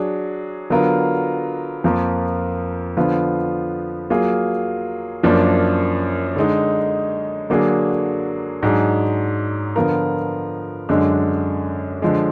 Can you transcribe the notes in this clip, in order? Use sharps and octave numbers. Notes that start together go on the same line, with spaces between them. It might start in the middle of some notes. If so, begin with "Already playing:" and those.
Already playing: F#3 D4 G#4
D3 F#3 B3 F4 A#4
F2 F3 A#3 F4 A#4
D3 F3 B3 F4
F#3 A#3 F4 G#4
F#2 F3 A#3 D4
D3 G#3 D#4
D3 F#3 A#3 D4 G#4
G#2 F#3 D4 G#4
D3 F3 B3 F4 A#4
F#2 D3 G#3 D4
D3 F3 G#3